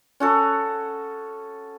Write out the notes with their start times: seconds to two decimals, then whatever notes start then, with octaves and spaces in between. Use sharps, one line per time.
0.20 C#4 F#4 A4